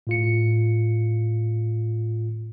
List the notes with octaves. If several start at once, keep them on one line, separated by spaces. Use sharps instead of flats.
A2 F4 C#7